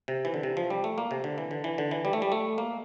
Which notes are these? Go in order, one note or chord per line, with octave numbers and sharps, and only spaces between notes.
C3
E3
D3
C3
F3
G3
A3
A#3
C3
D3
E3
D3
E3
D3
E3
G3
A3
G3
A3
A#3